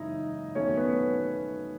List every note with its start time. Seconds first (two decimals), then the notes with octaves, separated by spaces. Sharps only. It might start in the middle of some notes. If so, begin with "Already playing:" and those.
Already playing: G#1 F#2 C#3 E3 G#3 D#4 E4 D#5
0.55 E1 E2 D#3 F#3 A3 C#4 C#5
0.77 B3 B4